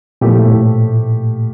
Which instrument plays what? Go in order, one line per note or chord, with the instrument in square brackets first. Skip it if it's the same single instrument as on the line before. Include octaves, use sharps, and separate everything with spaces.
[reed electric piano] A#2 [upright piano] F3 A3 E4 G4
[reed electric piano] A2